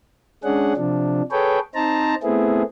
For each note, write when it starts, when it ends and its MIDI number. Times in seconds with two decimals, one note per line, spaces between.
0.44 0.73 56
0.44 0.73 61
0.44 0.73 62
0.44 0.73 68
0.44 0.73 78
0.77 1.22 48
0.77 1.22 53
0.77 1.22 62
1.31 1.59 68
1.31 1.59 69
1.31 1.59 71
1.31 1.59 73
1.31 1.59 79
1.75 2.15 60
1.75 2.15 63
1.75 2.15 72
1.75 2.15 81
1.75 2.15 82
2.23 2.63 57
2.23 2.63 59
2.23 2.63 60
2.23 2.63 64
2.23 2.63 68